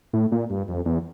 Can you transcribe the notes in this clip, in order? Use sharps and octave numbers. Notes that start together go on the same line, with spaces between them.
A2
A#2
G2
F2
E2